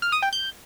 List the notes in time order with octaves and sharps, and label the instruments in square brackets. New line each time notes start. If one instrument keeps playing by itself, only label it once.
[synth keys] F6
D#6
G5
G6